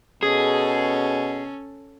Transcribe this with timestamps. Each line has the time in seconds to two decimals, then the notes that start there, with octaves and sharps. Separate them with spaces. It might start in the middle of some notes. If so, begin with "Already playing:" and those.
0.23 B2 C#4 G#4 A4